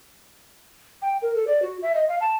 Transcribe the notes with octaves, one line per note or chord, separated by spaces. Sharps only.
G5
A#4
A4
D5
F#4
E5
D#5
F5
A5